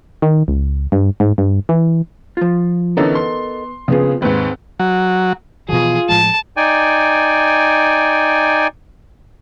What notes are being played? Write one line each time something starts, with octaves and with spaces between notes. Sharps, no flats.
D#3
C#2
G2
G#2
G2
E3
F3 F4
D3 E3 B3 C#4 D#4 A4 A#4
C6
F2 C#3 F3 B3 G#4
D#2 G#2 C4 B4
F#3
B2 E3 F3 F4 G#4
A2 F3 G#3 A5
D#4 D5 G5 G#5